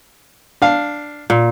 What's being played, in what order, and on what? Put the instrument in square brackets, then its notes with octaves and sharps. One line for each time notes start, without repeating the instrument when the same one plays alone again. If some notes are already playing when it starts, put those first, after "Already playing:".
[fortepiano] D4 F5
[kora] A#2